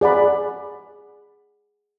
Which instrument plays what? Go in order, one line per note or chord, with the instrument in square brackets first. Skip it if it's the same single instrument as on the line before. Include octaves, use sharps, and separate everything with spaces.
[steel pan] G#4 D5 F#5 B5